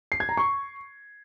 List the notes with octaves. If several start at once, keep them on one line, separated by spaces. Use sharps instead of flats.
C7
G#6
A#5
C#6